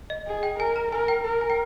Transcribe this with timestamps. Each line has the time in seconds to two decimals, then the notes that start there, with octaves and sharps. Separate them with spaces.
0.10 D#5
0.27 G#4
0.43 G5
0.59 A#4 G#5
0.76 A#5
0.92 A#4 G#5
1.08 G5
1.24 A#4
1.41 G#5
1.50 G5